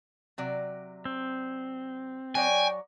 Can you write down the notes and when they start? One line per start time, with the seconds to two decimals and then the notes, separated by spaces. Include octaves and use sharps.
0.38 C3 F#3 D5
1.05 C4
2.35 F#3 C#5 D5 G5 G#5